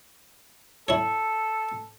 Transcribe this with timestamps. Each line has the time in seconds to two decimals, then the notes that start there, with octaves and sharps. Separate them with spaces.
0.88 E4 A4 C#5